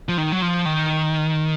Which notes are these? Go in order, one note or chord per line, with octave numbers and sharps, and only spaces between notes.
F3
D#3
F#3
F3
D#3